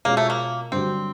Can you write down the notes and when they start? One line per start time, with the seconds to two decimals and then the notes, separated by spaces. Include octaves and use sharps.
0.05 B2 G#3 A#3 C#4 F4
0.17 A3
0.30 A#3
0.72 G2 D3 F#3 C4